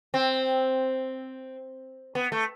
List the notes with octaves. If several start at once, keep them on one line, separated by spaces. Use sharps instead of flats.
C4
B3
A3